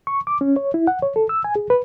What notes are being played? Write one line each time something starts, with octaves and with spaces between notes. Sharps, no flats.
C#6
D6
C#4
C#5
E4
F#5
C#5
A4
E6
G#5
G#4
B4